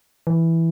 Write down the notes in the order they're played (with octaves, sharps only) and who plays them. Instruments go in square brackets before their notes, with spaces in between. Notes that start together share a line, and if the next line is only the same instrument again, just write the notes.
[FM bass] E3